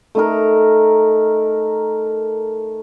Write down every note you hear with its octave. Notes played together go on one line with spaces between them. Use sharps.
A3 D#4 A#4